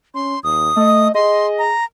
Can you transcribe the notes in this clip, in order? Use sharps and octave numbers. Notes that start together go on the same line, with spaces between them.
C#4 C6
D#2 D#6
A3 D#5
G#4 D#5 C6
A#5